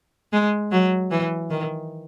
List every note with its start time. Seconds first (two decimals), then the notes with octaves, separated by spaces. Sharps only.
0.33 G#3
0.72 F#3
1.11 E3
1.50 D#3